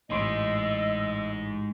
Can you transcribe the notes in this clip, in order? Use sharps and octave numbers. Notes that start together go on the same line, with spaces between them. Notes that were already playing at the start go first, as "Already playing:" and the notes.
A1 G#3 D#4 D#5 C6 E6 D7